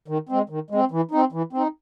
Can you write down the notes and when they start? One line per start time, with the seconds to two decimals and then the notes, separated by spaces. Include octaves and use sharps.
0.08 D#3
0.29 G#3 C4
0.49 D#3
0.70 G#3 C4
0.91 E3
1.11 C4 D#4
1.32 E3
1.53 C4 D#4